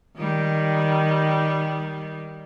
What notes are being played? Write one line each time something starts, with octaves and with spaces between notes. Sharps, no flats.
D#3 G3